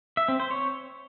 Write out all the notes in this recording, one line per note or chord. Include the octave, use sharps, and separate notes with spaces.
E5
C4
C5
C#5